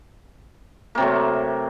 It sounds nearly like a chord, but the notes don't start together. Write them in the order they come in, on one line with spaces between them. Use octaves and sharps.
A#3 C3 F#3 A3